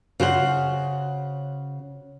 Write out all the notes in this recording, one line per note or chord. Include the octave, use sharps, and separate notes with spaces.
C#3 F#4 C5 F#5